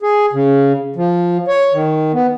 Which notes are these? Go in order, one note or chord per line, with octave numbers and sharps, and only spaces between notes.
G#4
C#3
F3
C#5
D#3
B3